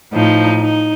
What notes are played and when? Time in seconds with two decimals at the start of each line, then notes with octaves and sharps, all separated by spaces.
0.12 A2 F3 D#4
0.60 D#4